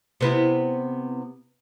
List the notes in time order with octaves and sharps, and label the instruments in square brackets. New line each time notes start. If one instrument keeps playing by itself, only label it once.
[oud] C3 B3 E4